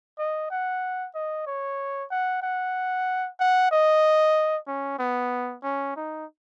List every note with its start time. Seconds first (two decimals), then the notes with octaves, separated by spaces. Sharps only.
0.19 D#5
0.51 F#5
1.15 D#5
1.47 C#5
2.11 F#5
2.42 F#5
3.40 F#5
3.71 D#5
4.67 C#4
4.99 B3
5.63 C#4
5.96 D#4